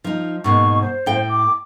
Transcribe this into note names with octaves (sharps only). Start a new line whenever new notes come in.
F3 D#4
G#2 B2 A#3 C#6
C5
A2 G5
D6